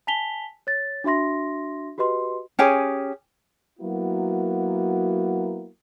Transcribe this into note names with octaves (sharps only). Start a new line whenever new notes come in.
G#5 A5 B6 F7 G7
C#5 A6
D4 F#4 E5 C6 A#6
F#4 G4 B4 D#5 C6
C#4 G4 G#4 G#5
F#3 A#3 B3 E4 F#4 A#4